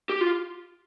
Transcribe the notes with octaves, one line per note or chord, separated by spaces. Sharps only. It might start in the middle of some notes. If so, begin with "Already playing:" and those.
G4
F4